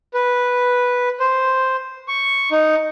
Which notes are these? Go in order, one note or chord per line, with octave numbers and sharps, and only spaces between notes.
B4
C5
C#6
D#4